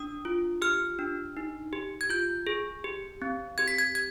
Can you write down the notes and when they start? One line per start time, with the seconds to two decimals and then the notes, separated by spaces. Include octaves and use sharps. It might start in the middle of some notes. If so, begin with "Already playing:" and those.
Already playing: D4 D#6
0.25 F4
0.62 G4 F6
0.99 D4
1.37 D#4
1.73 G4
2.01 G#6
2.10 F4 G6
2.47 G#4
2.84 G4
3.22 C4
3.58 G4 G#6
3.68 B6
3.78 G#6
3.95 G#6